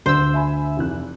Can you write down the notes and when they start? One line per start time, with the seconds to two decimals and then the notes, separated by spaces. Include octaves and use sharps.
0.06 D2 C5 E6
0.34 E5 G#5 B5
0.77 F1 E3 F#6